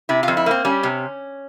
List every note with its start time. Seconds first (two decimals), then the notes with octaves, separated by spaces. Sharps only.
0.09 C3 E4
0.23 F2 F4
0.37 E4
0.46 A#3 C4
0.65 G3 C#4
0.83 C3